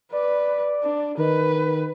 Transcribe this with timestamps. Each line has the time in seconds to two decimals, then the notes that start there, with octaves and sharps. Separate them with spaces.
0.13 B4 D5
0.83 D4
1.17 D#3 B4